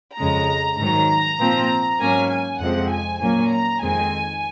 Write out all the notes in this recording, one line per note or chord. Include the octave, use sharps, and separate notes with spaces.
F2 C#3 G#3 A#5
G#2 D#3 F#3 A#5
A#2 F3 C4
G#2 F#3 A#3 C#4 G#5
G#5
F2 C3 F3 G#3 C4 F#5
G#5
A#2 F#3 A#3 C#4 G#5
A#5
F2 D#3 G#3 C4 G#5